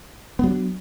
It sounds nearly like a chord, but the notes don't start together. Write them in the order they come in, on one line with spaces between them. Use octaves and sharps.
B3 F#3 D4